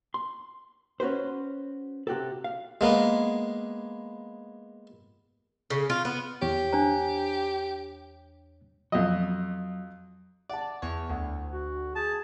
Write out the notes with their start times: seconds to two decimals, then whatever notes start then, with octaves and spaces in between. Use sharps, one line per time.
0.14 C6
1.00 C#4 F#4 B4 C5
2.07 C3 F#4 G4 A4
2.44 F5
2.81 G#3 A#3 B3
5.70 C#3
5.90 F4
6.05 B3
6.42 E2 G4 C#5
6.73 D4 C5 A#5
8.92 F2 F#3 D#5
10.49 D5 F#5 A5
10.82 E2 C#5
11.10 D2 F#5
11.52 F#4
11.95 G#4 A5